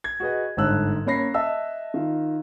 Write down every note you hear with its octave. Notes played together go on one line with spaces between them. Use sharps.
G#6
F#4 G#4 B4 D#5
G1 G#2 D3 A5 E6 F#6
A#3 C#4 C#5 B5 A#6 C7
D#5 E5 A5 E6
D#3 F4